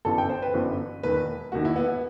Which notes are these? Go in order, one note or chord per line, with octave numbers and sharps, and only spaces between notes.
G1 F#2 E3 A4
G5
C5
B4
G1 F#2 E3
E1 D#2 D#3 B4
E1 D#2 D#3 F#4
E4
B3
B3